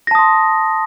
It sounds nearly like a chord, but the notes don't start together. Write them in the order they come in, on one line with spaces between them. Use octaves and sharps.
A#6 A5 D#6 C6